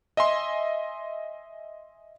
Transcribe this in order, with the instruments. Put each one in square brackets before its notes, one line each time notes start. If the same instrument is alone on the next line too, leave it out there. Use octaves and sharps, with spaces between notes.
[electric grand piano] D#5 E5 G#5 C6